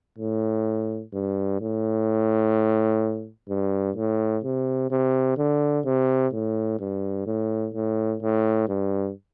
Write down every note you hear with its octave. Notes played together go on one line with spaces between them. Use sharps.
A2
G2
A2
G2
A2
C3
C3
D3
C3
A2
G2
A2
A2
A2
G2